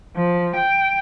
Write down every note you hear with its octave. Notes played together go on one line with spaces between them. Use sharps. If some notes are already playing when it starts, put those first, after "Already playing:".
F3
G5